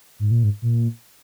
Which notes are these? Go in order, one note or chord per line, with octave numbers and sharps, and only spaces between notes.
G#2
A#2
G#2
A#2